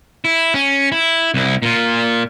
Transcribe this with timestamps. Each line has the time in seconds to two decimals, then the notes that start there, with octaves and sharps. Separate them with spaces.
0.25 E4
0.54 C#4
0.92 E4
1.34 C2 E4
1.62 A#2 F4